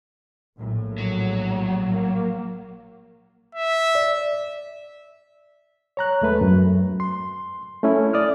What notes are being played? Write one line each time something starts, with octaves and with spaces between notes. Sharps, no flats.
A#1 A2
F#3
A#3
E5
D5
C#5 A#5 F#6
D#2 G#3 A3 B4
F#2
C6
A3 C#4 E4
D5 D#6 F6